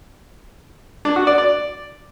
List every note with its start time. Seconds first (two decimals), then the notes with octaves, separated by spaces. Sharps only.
1.05 D4
1.16 F#4
1.27 D5
1.38 D5